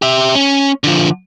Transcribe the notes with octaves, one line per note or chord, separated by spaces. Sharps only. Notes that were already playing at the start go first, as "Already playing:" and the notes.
G4 E5
C#4
D3 F3